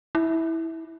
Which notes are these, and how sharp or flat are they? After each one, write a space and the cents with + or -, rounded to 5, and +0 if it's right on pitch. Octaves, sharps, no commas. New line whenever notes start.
E4 -15